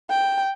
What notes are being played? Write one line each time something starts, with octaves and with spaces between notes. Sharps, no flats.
G5